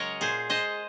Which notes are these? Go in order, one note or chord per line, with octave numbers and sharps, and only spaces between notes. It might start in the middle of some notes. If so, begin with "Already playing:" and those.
Already playing: C#3 F#3 G#3 A#4 C#5 D#5
A#2 G#4 C5
G#3 C5 D#5